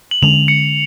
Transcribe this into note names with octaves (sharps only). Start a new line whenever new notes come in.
F#7
D3 G#3 C#4 F7
C#7